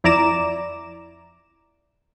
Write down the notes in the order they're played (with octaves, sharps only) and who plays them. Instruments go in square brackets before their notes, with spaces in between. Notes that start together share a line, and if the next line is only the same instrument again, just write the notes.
[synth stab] F2 E4 D5 A#5 D6 E7